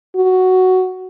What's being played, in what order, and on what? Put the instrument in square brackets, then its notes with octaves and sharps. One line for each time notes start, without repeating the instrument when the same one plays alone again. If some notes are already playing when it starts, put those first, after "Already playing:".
[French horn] F#4